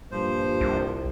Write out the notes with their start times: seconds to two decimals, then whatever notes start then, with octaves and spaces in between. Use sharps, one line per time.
0.12 G2 A#2 F3 C5
0.61 C2